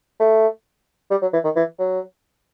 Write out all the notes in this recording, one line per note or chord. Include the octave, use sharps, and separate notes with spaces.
A3
G3
F#3
E3
D#3
E3
F#3